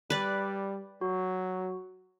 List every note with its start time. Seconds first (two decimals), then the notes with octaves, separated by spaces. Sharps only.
0.10 G3 B4 D5
1.01 F#3 F#4